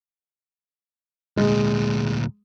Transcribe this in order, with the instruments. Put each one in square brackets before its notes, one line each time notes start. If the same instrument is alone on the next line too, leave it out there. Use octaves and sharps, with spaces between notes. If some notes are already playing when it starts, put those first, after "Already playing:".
[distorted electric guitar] D2 A#2 [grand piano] G#3